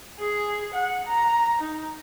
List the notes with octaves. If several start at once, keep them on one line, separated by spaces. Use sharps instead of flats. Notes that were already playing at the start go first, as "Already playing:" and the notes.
G#4
F#5
A#5
D#4